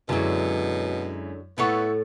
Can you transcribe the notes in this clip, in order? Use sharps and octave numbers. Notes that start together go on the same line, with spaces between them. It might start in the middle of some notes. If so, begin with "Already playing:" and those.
F#2 B2 D3 F#3 G#3 E4
A2 B3 E4 A4 C#5 F#5 C#6